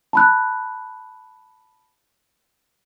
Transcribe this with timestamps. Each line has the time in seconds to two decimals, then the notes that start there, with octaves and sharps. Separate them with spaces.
0.13 A5 B5 F#6